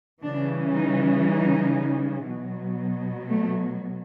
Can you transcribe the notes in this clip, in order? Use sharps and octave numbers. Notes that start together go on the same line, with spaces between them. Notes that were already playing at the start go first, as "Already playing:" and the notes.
C#3 E3 G3 D4
D#4
D#4
B2 F#3
A3